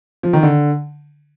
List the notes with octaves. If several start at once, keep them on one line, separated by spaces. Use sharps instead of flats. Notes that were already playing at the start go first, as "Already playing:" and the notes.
F3
D#3
D3